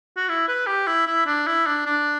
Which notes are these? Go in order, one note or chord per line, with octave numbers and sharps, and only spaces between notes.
F#4
E4
B4
G4
E4
E4
D4
E4
D4
D4